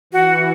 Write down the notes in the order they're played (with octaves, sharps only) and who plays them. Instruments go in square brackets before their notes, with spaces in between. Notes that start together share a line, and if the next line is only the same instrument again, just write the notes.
[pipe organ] E3 [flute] F#4